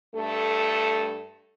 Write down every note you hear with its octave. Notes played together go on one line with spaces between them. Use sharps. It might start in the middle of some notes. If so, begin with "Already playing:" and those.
G2 A3 A4